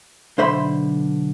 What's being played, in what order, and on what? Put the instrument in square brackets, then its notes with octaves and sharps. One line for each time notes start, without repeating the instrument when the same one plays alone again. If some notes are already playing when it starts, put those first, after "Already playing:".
[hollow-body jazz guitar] B1 D3 C5 E5 B5 C6